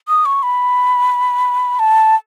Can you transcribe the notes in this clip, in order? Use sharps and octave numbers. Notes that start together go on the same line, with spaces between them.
D#6
C#6
B5
A5